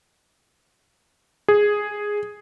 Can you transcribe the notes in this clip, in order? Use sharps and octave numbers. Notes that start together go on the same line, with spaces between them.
G#4